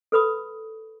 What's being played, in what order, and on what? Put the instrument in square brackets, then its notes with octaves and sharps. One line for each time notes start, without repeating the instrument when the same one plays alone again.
[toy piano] A4 B4 B5 D#6